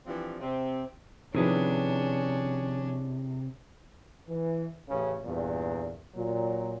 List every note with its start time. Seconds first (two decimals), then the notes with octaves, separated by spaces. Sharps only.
0.06 E3 F3 G3 C4 D4
0.40 C3 C4
1.35 C3 D#3 F3 C#4 D4 E4 G#4 B4
4.29 E3
4.88 A1 C#3
5.24 E2 G2 A#2
6.15 A#2 F#3